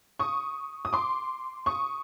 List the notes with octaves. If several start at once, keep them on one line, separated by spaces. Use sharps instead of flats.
C#6 D#6
D#6
C6 D6
C#6 D#6